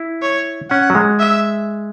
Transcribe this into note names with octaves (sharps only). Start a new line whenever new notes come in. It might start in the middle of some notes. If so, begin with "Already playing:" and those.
Already playing: E4
C#5
C#4 F#5
F#3
G#3
E5